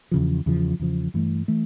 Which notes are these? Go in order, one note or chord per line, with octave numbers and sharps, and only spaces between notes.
E2 C#3 F3
E2 C#3 F3
E2 C#3 F3
G2 E3 A3
E3 A3